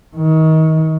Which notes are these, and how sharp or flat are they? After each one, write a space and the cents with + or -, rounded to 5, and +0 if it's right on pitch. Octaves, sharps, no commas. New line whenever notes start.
D#3 +30